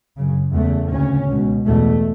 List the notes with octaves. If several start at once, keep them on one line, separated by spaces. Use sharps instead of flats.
F#2 C#3
E2 C#3 A3
D2 C#3 C#4
C#2 B2
E2 B2 A3